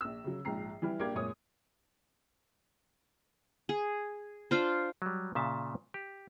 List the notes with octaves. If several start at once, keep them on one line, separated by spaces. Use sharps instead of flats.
A#1 E6
C#3 F#3
A#1 G#2 F3 G5 A#5 C7
E3 G3 E4 B5 F6
A#1 A#3 D4 G4 D6 G#6
F#2 A#2 G#3 C#5 D#6
G#4
D4 F4 C5
F#3 G3
A#2 C#3 E5 A5
G4